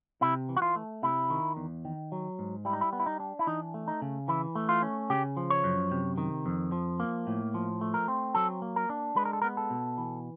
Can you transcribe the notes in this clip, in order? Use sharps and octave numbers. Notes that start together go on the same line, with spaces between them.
C3 E4
E3
F#4
F4
A3
C3 E4
D#3
E2
D#3
F#3
G#2
G3 E4
D#4
E4
B3
E4
D#4
D4
E4
E3 D#4
A3
D#4
C#3
E3 E4
A3
F4
C#4
C#3 G4
F3
C#5
F#2
C3
D#3
F2
F3
A#3
A2
F3
A3
A#4
C4
F#3 A4
A#3
A#4
D4
G#3 B4
A#4
A4
B3 A#4
A4
B2
E3